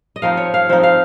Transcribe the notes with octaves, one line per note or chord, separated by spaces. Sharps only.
D#5
F3 C4 D#4 F5
C#5
F5
F3 C4 D#4
F5